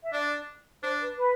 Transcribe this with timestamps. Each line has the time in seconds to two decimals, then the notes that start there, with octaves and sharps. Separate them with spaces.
0.03 E5
0.12 D4 D5
0.82 D4 C5
1.00 B4
1.18 B4